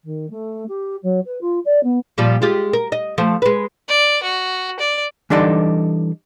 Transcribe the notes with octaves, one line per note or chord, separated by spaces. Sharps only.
D#3
A3
G4
F#3
B4
F4
D5
B3
A#2 F3 G3
G#3 F4 G4
A#4
D#5
F3 A3
G#3 B4
D5
F#4
D5
E3 G3 D4 D#4 A4 D5